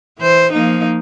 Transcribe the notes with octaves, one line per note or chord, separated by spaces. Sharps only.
E3 C5
F3 A#3 D#4